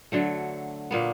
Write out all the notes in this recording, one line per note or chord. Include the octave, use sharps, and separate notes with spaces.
D3 F#3 A3
A#2 A#3 B3